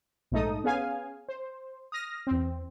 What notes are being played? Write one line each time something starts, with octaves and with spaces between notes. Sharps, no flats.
A#1 G#2 A3 D#4 A4 D#6
B3 C#4 G#4 F5 G#5
C5
D#6 F6 A#6
E2 C4